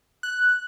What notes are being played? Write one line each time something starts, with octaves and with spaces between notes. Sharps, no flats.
F#6